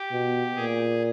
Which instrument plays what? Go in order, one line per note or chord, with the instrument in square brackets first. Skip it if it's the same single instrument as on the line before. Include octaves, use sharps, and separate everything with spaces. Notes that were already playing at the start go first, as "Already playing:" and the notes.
Already playing: [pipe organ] G4
[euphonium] B2
[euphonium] A#2 [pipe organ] G#4